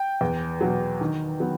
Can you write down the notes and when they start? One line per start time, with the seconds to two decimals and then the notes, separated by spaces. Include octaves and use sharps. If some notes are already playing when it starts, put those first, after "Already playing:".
Already playing: G5
0.21 E2
0.61 B2 F#3
1.01 D#3
1.40 F#3 B3